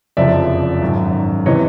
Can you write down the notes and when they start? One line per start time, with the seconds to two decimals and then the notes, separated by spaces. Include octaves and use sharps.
0.17 F#1 F2 C3 F3 D5 E5
0.82 G#1 F#2 D#3
1.46 C3 E3 C#5 D#5